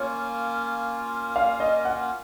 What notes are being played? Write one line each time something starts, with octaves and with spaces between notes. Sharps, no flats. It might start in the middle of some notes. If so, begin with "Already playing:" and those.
Already playing: A#3 C#4 F4 C#5
F5
D#5
F#5